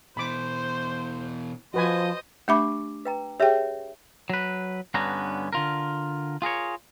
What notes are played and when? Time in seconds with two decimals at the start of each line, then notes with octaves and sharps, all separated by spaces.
0.17 B2 E3 C5 B5 D6
1.74 F3 F#4 B4 C5 D#5 G#5
2.48 A3 D4 G4 E5 B5 D6
3.05 B4 G5 A#5
3.40 G4 G#4 C#5 E5 G5
4.30 F#3 B4
4.94 G2 D3 B3 C#4 A#5
5.53 D3 F4 A#4
6.42 F4 G#4 A#4 C#5